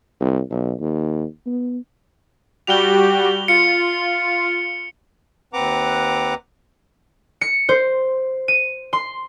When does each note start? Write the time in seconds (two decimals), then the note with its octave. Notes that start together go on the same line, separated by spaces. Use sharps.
0.20 C2
0.51 B1
0.80 D#2
1.46 B3
2.67 G3 F#4 G4 F7 G7
3.48 F4 C#7
5.53 D#2 C4 B4 F#5 A#5 D6
7.41 C#7
7.69 C5
8.48 D#7
8.93 C6